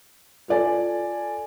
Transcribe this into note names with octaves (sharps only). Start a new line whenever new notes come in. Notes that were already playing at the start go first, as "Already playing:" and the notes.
F4 A4 D5 G#5